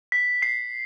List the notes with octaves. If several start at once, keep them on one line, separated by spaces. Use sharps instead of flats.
B6
C7